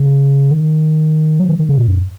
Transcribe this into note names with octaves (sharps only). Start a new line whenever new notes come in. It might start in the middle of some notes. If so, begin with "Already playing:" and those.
Already playing: C#3
D#3
F#3
D#3
D#3
C#3
A#2
F#2